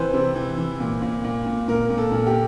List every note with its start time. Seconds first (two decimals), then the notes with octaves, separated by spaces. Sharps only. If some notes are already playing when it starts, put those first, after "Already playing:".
Already playing: C3 E3 B4 C5
0.14 C3
0.35 E3
0.57 E3
0.80 A#2
1.02 A#2
1.24 A#2
1.46 A#2
1.68 A#2 A#4
1.90 A#2
1.98 A4
2.12 A#2
2.27 G4